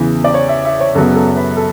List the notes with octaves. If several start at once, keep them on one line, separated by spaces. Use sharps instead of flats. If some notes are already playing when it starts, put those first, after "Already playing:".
Already playing: E2 C#3 E3
D5
C#5
E5
E5
C#5
F#2 C#3 F#3 B3 A4
A4
B4
A4